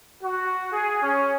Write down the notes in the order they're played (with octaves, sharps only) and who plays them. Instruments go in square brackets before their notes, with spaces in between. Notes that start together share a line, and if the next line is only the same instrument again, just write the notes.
[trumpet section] F#4
G#4
C#4